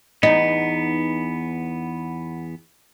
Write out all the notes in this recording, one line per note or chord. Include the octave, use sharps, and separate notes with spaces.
E2 B3 D#4